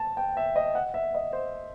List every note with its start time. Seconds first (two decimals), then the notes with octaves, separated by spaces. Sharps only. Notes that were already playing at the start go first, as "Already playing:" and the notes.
Already playing: A5
0.17 G5
0.37 E5
0.56 D#5
0.75 F#5
0.94 E5
1.15 D#5
1.33 C5